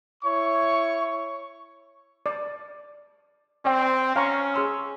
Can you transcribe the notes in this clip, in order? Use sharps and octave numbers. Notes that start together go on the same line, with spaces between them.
E4 C#5 C#6
D5
C4 D5 G5
C#4 F5 A#5 C#6
G#4 C6 E6